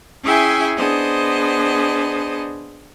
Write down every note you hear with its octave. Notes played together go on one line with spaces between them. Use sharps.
C#4 E4 G#4 E5 G5 G#5
B3 D4 G#4 C5 D#5